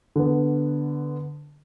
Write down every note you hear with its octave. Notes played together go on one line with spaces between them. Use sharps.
D3 B3